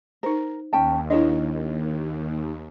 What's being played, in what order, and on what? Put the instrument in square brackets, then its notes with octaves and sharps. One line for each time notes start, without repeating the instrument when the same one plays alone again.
[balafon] D#4 C5 [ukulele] A#4
[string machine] D#2 [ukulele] C#4 G5 A5
[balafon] D4 E4 [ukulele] A#4 C#5 D#5